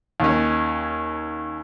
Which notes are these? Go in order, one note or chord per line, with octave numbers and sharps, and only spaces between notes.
D#2 C#4